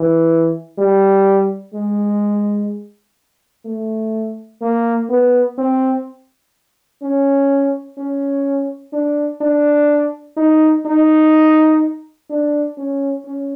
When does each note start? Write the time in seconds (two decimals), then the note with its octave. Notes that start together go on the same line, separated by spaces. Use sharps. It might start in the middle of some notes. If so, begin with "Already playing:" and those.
Already playing: E3
0.78 G3
1.74 G#3
3.65 A3
4.61 A#3
5.09 B3
5.58 C4
7.02 C#4
7.97 C#4
8.93 D4
9.41 D4
10.37 D#4
10.85 D#4
12.30 D4
12.77 C#4
13.26 C#4